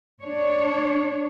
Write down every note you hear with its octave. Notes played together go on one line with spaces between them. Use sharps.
D4 C#5